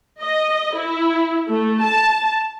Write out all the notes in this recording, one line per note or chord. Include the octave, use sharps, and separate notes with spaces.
D#5
E4
A3
A5